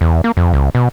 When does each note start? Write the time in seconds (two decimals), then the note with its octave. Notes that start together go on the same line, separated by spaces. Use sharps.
0.01 E2
0.24 A#3
0.37 F2
0.53 C#2
0.75 B2